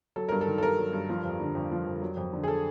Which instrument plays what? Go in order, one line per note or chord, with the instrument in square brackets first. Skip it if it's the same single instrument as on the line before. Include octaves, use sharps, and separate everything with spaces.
[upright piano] F#3 A4
G2 A#4
A4
D#3
A4
G2 A#4
F#3
G2
F3
F2
D3
F2
F3
F2
F#3
F2
D3
G#4
A4